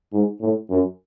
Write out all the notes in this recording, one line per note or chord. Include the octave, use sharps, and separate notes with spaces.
G#2
A2
F#2